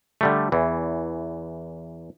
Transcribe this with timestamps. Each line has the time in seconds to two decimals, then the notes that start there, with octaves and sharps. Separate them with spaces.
0.21 D3 G3 A3
0.52 E2 E3